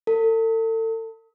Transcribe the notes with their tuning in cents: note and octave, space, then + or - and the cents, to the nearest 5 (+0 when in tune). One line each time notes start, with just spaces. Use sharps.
A4 +40